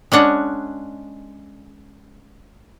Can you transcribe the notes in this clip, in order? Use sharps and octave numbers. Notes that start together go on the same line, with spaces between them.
G#3 C#4 D4 F#5